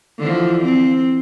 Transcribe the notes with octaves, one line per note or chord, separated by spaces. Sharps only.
D3 E3 F3
C4